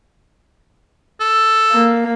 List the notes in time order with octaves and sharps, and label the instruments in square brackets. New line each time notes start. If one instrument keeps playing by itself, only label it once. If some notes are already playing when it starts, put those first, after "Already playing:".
[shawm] A4
[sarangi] A#3